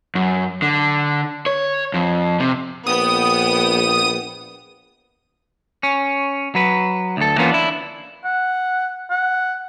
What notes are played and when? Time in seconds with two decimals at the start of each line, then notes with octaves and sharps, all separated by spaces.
0.15 F#2
0.62 D3
1.46 C#5
1.94 F2
2.40 C3
2.87 A#1 B3 G5 D#6
5.83 C#4
6.55 F#3 B4
7.17 D2 A4
7.38 E3 A#3 B3 C#4 F4
7.51 D4 E4
8.25 F#5
9.11 F#5